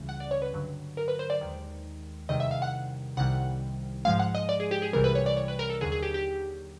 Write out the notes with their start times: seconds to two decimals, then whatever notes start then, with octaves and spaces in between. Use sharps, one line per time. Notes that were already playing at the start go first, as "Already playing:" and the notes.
Already playing: C#2 C#3 E3 G3
0.09 F#5
0.20 D5
0.31 C#5
0.42 B4
0.53 G2 D3 F#3
0.97 A#4
1.08 B4
1.19 C5
1.30 D5
1.41 D#2 D#3 G#3
2.29 E2 C3 D#3 G3 D#5
2.40 E5
2.51 F5
2.62 F#5
3.17 C2 C3 D#3 G3 F#5
4.05 G#2 F3 G#3 F5
4.19 F#5
4.35 D#5
4.49 D5
4.60 G#4
4.71 G4
4.82 G#4
4.93 C2 C3 E3 G3 A#4
5.04 B4
5.15 C#5
5.26 D5
5.37 C#5
5.48 B4
5.59 A#4
5.70 A4
5.81 D#2 D3 F#3 G#4
5.92 G#4
6.03 G4
6.14 G4